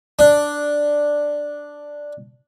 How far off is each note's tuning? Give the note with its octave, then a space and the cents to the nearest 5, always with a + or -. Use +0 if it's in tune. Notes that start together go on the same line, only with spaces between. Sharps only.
D4 +0